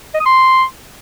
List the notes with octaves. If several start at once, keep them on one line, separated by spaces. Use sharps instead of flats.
D#5
D#6
C6